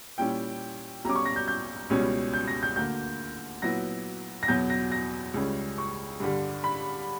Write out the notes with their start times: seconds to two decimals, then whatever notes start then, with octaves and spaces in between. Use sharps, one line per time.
0.18 A#2 G3 C#4 E4 G5
1.05 B1 B2 G3 C#4 A#5 D6
1.16 C#6
1.26 A#6
1.36 G6
1.48 G6
1.90 C#2 B2 G3 C#4
2.33 G6
2.48 A#6
2.63 G6
2.76 D2 D3 A#3 G6
3.62 A#2 F#3 B3 E4 A#6
4.43 A#6
4.48 E2 B2 F#3 G6
4.70 A#6
4.92 A#6
5.34 C#2 C#3 G3 C#4
5.78 C#6
6.20 G2 D3 G3
6.64 B5